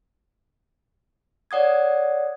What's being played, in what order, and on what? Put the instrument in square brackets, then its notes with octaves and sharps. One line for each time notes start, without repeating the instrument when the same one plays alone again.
[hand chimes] C#5 D5 F#5 D#6 G#6